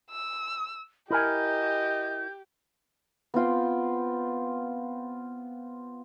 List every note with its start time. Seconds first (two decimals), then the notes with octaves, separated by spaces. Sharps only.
0.11 E6
1.11 E4 G4 A#4 D#5 G#5 G6
3.34 B3 C4 F4 G5